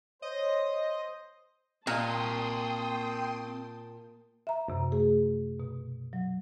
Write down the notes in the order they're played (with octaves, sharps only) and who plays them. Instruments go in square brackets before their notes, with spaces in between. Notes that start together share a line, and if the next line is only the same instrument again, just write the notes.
[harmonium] C5 [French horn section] C#5 [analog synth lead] D#5
[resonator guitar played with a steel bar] A#2 [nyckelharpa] A#3 A5 [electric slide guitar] C4 D5 [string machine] G5 C6 D#6
[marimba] E5 A#5
F#2 C3
A3 G#4
B2
F#3